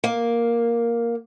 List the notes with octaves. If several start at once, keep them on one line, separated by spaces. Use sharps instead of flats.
A#3